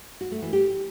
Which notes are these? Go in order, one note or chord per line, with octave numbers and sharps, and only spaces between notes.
F#4
A3
E3
G4